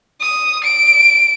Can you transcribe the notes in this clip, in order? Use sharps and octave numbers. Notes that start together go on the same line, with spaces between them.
D#6
D7